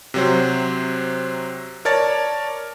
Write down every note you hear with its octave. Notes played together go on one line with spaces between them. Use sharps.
C3 F#3 C5
A#4 C#5 D5 A5 A6